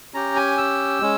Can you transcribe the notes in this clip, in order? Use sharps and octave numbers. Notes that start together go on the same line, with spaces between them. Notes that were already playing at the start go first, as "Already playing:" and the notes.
C#4 G4 A#5
G#5
E6
G#3 C#4